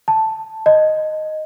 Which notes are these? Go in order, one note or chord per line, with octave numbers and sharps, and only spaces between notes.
A5
D#5